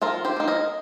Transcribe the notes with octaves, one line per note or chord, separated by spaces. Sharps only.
F3 F4 A#4
G4 C5
A#3 D#4
A#4 D#5